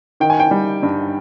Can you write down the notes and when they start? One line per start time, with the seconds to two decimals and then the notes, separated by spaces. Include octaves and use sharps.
0.20 D#3 G5
0.30 G#5
0.40 G5
0.51 G3
0.83 G2